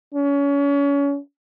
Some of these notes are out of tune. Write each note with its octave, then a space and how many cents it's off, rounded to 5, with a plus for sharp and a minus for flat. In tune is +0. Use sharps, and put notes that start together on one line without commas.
C#4 +30